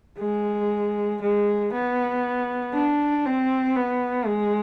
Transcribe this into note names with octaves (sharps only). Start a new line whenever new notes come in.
G#3
G#3
B3
D4
C4
B3
G#3